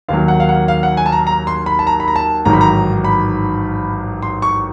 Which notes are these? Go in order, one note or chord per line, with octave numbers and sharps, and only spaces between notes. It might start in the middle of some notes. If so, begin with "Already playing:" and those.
D#2 D#3 F#3 F5
F#5
F5
F#5
F5
F#5
G#5
A5
A#5
A#5
C6
B5
A5
A#5
B5
A#5
A5
A1 G#2 D#3 F#3 A#5
B5
A#5
B5
C6
C#6